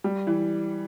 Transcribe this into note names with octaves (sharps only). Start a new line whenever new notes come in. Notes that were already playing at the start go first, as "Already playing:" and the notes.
G3
E3